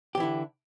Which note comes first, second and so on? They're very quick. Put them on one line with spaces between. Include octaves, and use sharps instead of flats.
G4 E3 E4 D3